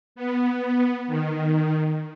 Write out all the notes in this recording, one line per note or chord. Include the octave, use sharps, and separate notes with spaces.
B3
D#3